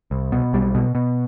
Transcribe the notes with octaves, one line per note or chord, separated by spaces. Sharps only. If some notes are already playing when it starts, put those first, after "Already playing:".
C2
B2
B1 G3
B2
B2